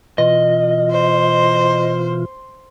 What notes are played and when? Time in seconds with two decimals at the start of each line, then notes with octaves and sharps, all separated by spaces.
0.18 B2 E3 F4 D#5
0.91 C5